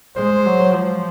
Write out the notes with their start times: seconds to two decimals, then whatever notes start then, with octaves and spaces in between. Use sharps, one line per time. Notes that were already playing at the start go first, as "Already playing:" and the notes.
0.16 G#3 C5
0.45 F#3
0.74 F3